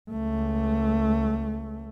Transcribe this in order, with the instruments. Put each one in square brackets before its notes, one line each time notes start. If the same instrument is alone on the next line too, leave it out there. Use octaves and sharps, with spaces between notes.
[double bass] C#2 A3